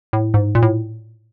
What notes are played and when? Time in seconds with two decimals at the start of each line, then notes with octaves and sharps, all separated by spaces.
0.13 A2
0.34 G#2
0.55 A#2
0.62 A2